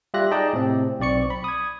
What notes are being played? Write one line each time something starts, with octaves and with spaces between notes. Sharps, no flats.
G3 F4 G4 E5 F#6 A#6
D#4 G#4 D5 D#5 G5 A5
A2 C3 C4
B1 C4 D5 C#6 C#7
B5
D#6 G#6